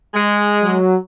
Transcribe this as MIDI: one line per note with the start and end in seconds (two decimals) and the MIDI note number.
0.14 0.76 56
0.62 0.95 54